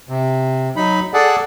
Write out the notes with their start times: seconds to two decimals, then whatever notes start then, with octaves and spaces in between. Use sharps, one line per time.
0.09 C3
0.76 F#3 D#4 B5
1.14 G#4 A4 D5 F#5